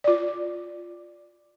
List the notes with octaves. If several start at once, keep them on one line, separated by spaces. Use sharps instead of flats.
F4 D5